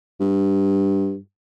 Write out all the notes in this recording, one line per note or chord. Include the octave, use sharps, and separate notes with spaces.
G2